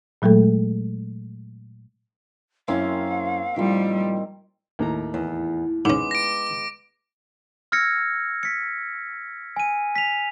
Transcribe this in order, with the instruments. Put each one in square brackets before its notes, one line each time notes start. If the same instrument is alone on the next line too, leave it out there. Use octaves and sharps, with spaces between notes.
[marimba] A#2 F#3 G#3 A3 A4
[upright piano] F#2 C#4 E4 [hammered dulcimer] A#3 C4 A#4 [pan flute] F5
[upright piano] A2 F3 [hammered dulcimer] D#3 A#3 C4 [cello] G3
[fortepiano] D#2 A2 A#5
[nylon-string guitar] E2
[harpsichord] G#2 C#4 [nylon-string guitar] G#3 B3 [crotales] D6
[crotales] A#6 D7
[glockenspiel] E6 F6 G#6 A#6 C#7
B6 C#7
G#5 D#7
B6 F7